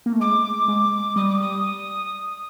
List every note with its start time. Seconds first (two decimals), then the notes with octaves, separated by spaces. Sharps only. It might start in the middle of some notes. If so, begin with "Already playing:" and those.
0.06 A#3
0.13 A3
0.20 G#3 D6
0.68 G#3
1.16 G3 D#6
1.29 D6
1.41 D#6